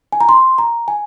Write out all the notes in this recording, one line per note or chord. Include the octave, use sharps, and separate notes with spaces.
G#5
A#5
C6
A#5
G#5